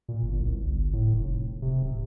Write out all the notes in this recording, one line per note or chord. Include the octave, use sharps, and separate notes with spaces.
A#2
G1
C2
G1
A2
F1
C3
D1